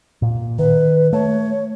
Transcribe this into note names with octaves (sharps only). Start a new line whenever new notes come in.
A#2
D#3 B4
A3 C#5